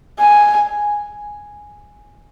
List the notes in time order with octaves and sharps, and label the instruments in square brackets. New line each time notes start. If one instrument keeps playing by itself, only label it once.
[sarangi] G#5